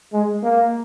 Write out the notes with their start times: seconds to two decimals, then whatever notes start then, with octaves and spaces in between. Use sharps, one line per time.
0.13 G#3
0.43 A#3